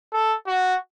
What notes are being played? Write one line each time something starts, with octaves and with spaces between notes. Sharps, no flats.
A4
F#4